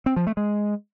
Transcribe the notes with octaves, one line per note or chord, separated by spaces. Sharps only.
C4
F3
A3
G#3